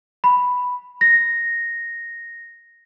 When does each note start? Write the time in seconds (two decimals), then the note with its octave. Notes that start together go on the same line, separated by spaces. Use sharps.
0.24 B5
1.01 A#6